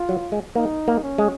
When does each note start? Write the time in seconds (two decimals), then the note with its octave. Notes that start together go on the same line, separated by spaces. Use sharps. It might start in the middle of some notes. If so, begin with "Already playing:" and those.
Already playing: F4
0.09 F#3
0.32 G#3
0.56 A#3 D#4
0.88 A#3
1.03 C#4
1.18 G#3